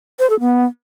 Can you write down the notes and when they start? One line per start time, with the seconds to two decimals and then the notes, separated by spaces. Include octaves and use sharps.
0.19 C5
0.30 A4
0.40 B3